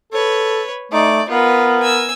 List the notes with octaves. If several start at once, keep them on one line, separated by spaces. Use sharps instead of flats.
A4 B4 C#5
A3 D#4 D5
B3 F4 A#4 B4
G#5 E6